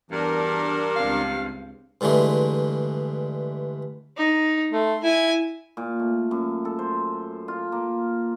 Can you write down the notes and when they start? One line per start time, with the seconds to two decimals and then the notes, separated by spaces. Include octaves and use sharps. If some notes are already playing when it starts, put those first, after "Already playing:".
0.11 E2 G2 D4 A#4
0.96 C#2 C4 F5
2.01 G2 D3 E3 G#3 A3
4.17 D#4
4.73 A3 C6
5.04 E4 G#5
5.77 A#2
6.00 A3
6.31 F#2
6.65 A4
6.79 C5
7.48 F4
7.72 A#3